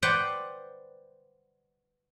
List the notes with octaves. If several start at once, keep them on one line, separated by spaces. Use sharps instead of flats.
B4 C5 D5 F#5 G5